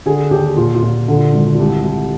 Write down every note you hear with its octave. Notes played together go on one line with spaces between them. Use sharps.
D3 G#4
D#2 G4
A#2 F4
F4
A#2
D3
G#1
F4
C2 G4
C2